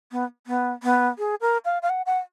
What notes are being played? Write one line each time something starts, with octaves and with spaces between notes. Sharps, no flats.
B3
B3
B3
G#4
A#4
F5
F5
F#5
F#5